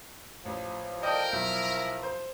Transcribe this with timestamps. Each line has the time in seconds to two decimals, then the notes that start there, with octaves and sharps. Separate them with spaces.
0.46 A1 F3
1.03 A4 A#4 D5 D#5 G5
1.32 B1 E4
2.03 C5